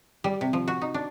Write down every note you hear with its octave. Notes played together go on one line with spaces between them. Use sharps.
G3
C3
F3
F#4
D#4
D4